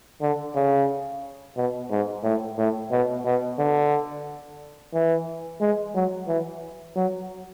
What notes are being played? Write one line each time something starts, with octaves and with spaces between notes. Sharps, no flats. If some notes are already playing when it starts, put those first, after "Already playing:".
D3
C#3
B2
G#2
A2
A2
B2
B2
D3
E3
G#3
F#3
E3
F#3